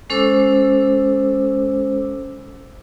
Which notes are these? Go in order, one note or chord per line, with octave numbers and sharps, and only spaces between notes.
G#3 C#4 A4 C5 D6 E6